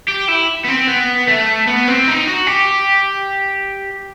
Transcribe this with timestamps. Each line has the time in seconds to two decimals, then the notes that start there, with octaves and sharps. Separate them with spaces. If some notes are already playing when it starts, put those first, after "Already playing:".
0.08 G4
0.28 E4
0.64 B3
0.68 C4
0.87 B3
1.27 A3
1.67 B3
1.88 C4
2.07 D#4
2.27 F#4
2.47 G4